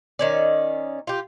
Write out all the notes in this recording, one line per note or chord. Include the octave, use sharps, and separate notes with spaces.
D#3 C#4 D5
F4 G4